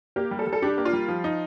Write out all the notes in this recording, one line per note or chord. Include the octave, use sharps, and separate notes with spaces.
A#3 G4
G3
A4
G3
A4
D4 G4
A#3
F4
G3
F3
D#4